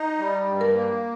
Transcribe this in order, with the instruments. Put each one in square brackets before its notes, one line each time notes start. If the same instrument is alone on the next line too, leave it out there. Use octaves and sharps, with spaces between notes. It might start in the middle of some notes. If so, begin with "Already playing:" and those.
Already playing: [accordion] D#4
G3
G2
[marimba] A#4
[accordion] A#3